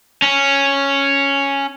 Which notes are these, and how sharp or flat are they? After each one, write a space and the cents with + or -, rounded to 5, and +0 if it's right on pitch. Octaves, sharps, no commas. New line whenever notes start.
C#4 +0